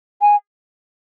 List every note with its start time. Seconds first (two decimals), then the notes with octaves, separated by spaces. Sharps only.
0.22 G#5